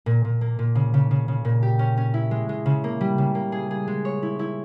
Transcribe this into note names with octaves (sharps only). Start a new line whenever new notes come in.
A#2
A#2
A#3
A#2
C#3
C#3
C#3
C#3
A#2
G4
C#4
C#4
E4
G#3
G#3
C#3
A#3
G3
C#3
A#3
G#4
G#4
G#3
C#5
E4
E4